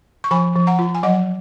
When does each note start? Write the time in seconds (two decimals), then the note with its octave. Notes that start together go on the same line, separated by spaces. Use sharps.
0.24 C#6
0.31 F3 G#5 B5
0.56 F3
0.67 F#5 A#5
0.79 F4
0.95 G#5
1.03 F#3 D#5 F#5